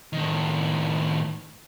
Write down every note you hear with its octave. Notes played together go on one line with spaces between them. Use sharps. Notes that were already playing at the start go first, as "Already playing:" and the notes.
A2 D#3